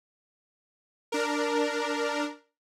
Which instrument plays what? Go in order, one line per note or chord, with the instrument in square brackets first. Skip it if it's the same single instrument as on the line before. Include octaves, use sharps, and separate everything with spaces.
[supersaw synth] D4 A#4